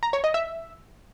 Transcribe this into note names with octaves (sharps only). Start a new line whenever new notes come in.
A#5
C#5
D#5
E5